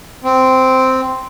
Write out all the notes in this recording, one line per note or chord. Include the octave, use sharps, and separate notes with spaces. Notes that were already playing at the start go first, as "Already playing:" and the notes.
C4